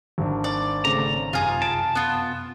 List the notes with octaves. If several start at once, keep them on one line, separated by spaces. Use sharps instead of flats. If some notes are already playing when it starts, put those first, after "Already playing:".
G#1 D4
D5
C#3 A3 C4 A#5
F#2 C3 F4 G#4
A5 D7
B3 F4